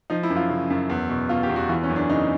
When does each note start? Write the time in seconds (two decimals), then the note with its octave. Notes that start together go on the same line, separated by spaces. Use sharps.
0.10 F3 D#4
0.23 E4
0.30 F#2
0.36 F4
0.49 C#3
0.70 F#2
0.89 E2
1.10 B2
1.29 B2 F4
1.43 G4
1.49 E2
1.56 F#4
1.69 E3 F4
1.83 C#4
1.90 F#2
1.96 D4
2.10 C#3 D#4